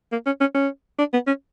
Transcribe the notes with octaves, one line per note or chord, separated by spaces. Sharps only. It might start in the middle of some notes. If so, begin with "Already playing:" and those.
A#3
C#4
C#4
C#4
D4
B3
C#4